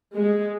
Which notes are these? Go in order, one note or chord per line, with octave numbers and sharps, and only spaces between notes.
G#3